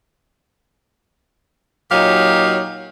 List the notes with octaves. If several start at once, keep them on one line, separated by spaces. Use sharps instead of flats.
A#2 F#3 D#4 G4 C#5 F5